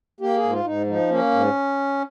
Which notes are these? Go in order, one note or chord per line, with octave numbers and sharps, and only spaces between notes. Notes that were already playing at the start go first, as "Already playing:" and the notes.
A#3 G4
G#4
G#2
F4
G#2 D#4
F3 D#4
A#3 C#4
G#2